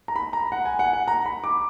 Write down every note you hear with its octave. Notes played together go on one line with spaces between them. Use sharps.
A#5
B5
A#5
F#5
G#5
F#5
F#5
A#5
B5
D6